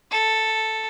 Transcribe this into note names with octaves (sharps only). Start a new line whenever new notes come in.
A4